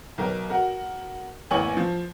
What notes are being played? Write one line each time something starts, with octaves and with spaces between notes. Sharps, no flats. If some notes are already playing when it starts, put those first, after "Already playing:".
B1 A#4
F#4 A#4
A1 E2 A#3 G#5 C#6 F#7
F3